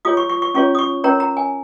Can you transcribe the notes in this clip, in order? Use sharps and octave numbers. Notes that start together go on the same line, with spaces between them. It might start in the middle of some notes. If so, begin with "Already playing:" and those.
F4 G#4 C#5 D#6
C#6
C#6
C#6
C#4 F4 G#4 C#5 C#6
D#6
C#6
C#4 A#4 C#5 A#5
A#5
G#5